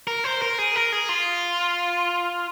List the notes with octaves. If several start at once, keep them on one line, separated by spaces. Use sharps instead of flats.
A#4
C5
A#4
G#4
A#4
G#4
F4